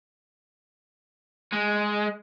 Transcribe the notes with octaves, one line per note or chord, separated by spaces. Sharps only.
G#3